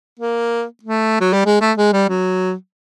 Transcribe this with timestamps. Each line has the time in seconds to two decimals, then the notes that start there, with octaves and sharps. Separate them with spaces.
0.19 A#3
0.83 A3
1.21 F#3
1.33 G3
1.46 G#3
1.61 A3
1.77 G#3
1.93 G3
2.09 F#3